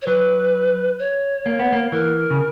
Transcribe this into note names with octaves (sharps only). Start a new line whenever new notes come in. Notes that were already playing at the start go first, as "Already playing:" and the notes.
C#5
F#3 B4
C#5
A#3
B3
A#3
E3 A#4
C#3